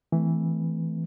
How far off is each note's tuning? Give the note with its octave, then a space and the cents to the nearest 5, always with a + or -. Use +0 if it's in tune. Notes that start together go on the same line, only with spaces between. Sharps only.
E3 -5 A3 -10 C4 -30